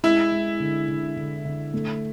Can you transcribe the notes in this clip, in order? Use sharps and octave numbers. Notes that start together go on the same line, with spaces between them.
G#3 E4
G#3
D3
D3
D3
D3
A3